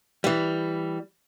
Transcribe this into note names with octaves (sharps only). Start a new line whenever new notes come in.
E3 G3